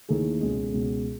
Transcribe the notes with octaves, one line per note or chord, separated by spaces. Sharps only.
D#2 D#3 A3 E4 G#4
C#2 B2 G#3
C#2 B2 G#3